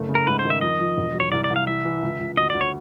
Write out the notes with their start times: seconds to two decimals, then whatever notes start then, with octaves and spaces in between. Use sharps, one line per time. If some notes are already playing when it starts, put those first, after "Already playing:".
Already playing: F#1 A3
0.09 C#3
0.15 A#4
0.27 G#2 B4
0.39 C5
0.45 D#3
0.50 E5
0.61 F2 D#5
0.80 F3
0.98 E1
1.14 F#3
1.20 C#5
1.32 C2 D5
1.44 D5
1.50 C2
1.56 F5
1.67 E3 E5
1.85 E3
2.03 C#2
2.19 C#2
2.37 D2 D#5
2.50 D2 D5
2.61 C#5